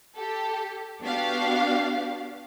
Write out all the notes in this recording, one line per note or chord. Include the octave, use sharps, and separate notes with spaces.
G4 A4
B3 D4 F#4 G4 F5